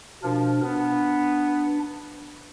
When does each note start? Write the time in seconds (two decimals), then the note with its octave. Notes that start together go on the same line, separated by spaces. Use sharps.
0.23 B2 F3 D4 A#4
0.63 B3 D4